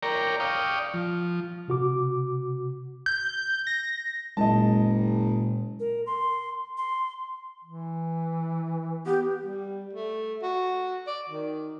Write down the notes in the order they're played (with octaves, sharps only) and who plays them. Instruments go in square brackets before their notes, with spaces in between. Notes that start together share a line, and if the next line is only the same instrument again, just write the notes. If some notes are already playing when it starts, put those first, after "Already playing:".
[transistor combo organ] A#4 C#5 D5 G5 A#5
D5 F5 G5 C#6 D#6
F3
[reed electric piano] C3 F#4 D6
[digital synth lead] G6
A#6
[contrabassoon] F#1 [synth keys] A#2 G#3 [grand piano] D#5 A5
[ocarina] A#4
C6
C6
[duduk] E3
[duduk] B3 [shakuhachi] G4
[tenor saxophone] G3
A3
F#4
D5
D#3